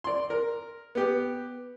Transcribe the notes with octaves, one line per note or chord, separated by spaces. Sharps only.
D5 C6
A#4
B3 G4